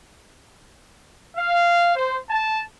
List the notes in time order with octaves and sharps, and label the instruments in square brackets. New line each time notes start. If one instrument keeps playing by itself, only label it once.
[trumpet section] F5
C5
A5